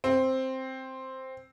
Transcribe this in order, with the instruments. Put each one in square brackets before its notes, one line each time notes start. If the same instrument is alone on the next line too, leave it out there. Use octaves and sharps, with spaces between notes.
[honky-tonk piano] C4